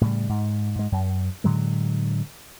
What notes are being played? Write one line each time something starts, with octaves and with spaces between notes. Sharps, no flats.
A2 C#3 G3
G#2
G#2 G#3
F#2
A2 D3 F#3 G#3